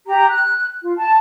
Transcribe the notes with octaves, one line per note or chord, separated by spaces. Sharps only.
G4 A#5
F#6
F4
A5